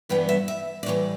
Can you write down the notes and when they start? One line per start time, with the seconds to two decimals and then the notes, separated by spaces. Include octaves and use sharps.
0.09 G2 E3 G3 B3 G5
0.29 E5
0.48 E5
0.83 D5
0.86 A2 E3 G3 C#5